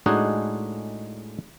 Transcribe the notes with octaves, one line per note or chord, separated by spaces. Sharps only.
A2 G#3 D4 D#4 F#4 G#4